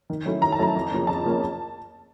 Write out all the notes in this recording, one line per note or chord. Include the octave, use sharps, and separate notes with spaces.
D#3
F#3 A3 C#4 E4
D#3 A#5
A5
F#3 A3 C#4 E4 A#5
F2
C#3 F3 A#3 C#4
F2 A5
C#3 F3 A#3 C#4